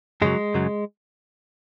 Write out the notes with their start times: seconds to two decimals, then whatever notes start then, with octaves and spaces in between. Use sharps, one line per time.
0.22 F#2 C#3 F#3 G#3
0.54 F#2 C#3 F#3